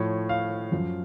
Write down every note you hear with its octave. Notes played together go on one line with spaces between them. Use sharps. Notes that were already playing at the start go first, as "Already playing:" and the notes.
Already playing: A2 F3 C#5
F5
F#2 F3